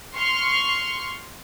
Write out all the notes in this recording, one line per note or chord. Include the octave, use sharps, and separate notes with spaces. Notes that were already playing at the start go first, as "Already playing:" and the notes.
C6 C#6 F6